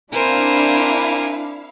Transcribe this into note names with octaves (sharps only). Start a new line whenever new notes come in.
C4 D4 E4 A#4 C5 F5 G#5